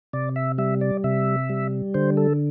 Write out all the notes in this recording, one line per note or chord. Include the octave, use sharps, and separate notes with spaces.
C3 D5
E5
G3 E5
D5
C3 E5
G3
D3 C5
A4